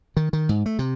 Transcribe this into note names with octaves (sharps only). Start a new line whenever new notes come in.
D#3
D#3
G#2
A3
C3